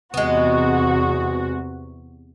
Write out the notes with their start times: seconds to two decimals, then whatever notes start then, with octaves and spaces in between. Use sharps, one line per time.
0.14 E2 C3 G#3 B3 F#4